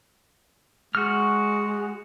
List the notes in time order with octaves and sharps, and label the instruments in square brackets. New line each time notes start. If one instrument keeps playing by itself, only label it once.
[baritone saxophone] G#3 [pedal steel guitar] F#4 F6